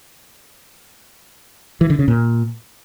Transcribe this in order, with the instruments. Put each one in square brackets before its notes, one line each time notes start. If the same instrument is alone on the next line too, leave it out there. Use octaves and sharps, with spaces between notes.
[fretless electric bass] E3
D3
C#3
A#2